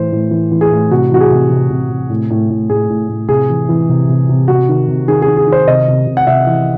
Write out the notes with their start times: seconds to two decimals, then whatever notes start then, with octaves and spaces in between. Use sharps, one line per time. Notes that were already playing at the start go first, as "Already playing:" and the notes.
Already playing: A2 E3 C5
0.12 A2
0.31 E3
0.52 E3
0.61 G#4
0.71 A2
0.91 C3 F#4
1.11 E3 F#4
1.20 G#4
1.30 C3
1.50 C3
1.70 C3
1.90 C3
2.10 A2
2.30 A2
2.50 A2
2.70 A2 G#4
2.89 A2
3.09 A2
3.29 C3 G#4
3.49 E3
3.69 E3
3.89 C3
4.09 C3
4.29 C3
4.48 C3 F#4
4.69 D#3
4.88 C3
5.08 D#3 G#4
5.22 G#4
5.28 D#3
5.37 G#4
5.47 D#3
5.52 C5
5.67 C3 D#5
5.88 C3
6.07 C3
6.17 F#5
6.27 C3 E5
6.47 E3